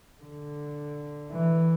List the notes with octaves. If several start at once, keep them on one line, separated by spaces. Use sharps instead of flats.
D3
E3